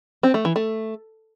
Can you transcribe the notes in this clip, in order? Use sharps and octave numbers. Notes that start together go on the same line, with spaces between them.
C4
A3
E3
A3